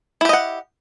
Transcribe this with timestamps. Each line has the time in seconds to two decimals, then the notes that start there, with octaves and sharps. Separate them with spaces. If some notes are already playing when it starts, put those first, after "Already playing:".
0.21 E4
0.25 G4
0.29 D#5
0.33 F#5